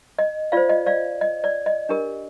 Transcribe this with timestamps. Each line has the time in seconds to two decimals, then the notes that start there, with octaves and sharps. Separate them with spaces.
0.18 D#5
0.52 F4 C5 D5 F5
0.69 D#5
0.86 D5 F5
1.21 D#5
1.44 D5
1.66 D#5
1.89 D4 G4 A#4